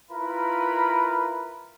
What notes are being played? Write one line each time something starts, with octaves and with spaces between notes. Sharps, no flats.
E4 F4 A#4 B4 B5